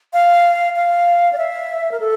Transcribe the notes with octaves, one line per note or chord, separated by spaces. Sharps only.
F5
F5
D5
E5
A#4
A4